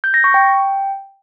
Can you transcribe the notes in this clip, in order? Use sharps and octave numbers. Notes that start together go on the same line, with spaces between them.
G6
A#6
C#6
G5